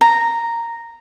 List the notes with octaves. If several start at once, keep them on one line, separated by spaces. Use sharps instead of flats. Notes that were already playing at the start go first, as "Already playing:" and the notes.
A#5